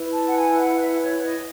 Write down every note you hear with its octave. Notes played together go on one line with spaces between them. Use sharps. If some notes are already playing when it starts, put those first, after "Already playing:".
Already playing: E4 B4
A5
F#5
G#5
F#5
E5
C#5
D#5